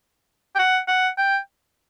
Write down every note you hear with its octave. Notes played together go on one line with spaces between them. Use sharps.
G5
F#5
F#5
G5